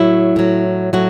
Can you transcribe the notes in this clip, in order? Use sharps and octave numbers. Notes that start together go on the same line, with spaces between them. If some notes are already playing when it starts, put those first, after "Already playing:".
Already playing: A2 F#3 E4
A2 F#3
A2 F#3 F#4